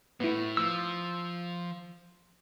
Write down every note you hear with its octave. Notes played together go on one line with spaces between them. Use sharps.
A2 B3 E4
F3 E6